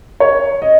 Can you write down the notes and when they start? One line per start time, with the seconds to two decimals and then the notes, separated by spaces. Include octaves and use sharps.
0.20 C#5
0.62 D#5